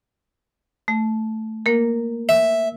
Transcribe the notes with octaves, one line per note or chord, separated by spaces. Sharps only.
A3
A#3 A#4
E5